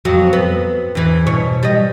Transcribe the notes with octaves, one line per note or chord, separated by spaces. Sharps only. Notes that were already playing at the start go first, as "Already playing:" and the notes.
F2 F#3
B3
E2 E3
B2 C#5
G3 D#5